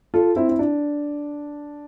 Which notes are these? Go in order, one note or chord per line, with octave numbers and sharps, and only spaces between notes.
F4 A4
C4 E4
E4
D4